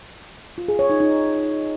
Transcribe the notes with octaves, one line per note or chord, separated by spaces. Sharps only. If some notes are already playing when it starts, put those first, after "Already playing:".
F4
G#4
C#5
D#4
D#4